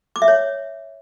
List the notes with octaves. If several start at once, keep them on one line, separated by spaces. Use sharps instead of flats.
D6
E5
C#5